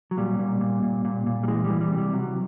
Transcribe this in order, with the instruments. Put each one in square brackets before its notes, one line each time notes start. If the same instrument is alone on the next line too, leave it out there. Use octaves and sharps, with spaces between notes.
[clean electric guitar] F#3
A#2 G3
A#2
A#2
A#2
A#2
A#2
G3
E3 G#3
G3
E3
G3
C3
G3
C3 F#3